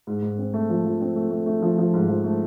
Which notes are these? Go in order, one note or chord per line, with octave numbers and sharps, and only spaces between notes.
G#2
G#2
C4
A3
F3
F3
C4
A3
A3
A3
F3
F3
G#2
F3
A3